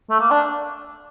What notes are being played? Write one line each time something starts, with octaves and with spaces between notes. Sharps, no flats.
A3
A#3
D4